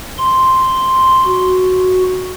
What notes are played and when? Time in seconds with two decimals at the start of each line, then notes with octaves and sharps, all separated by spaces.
0.18 C6
1.25 F#4